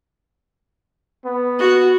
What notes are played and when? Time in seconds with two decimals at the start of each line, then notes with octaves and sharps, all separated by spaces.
1.25 B3
1.59 F#4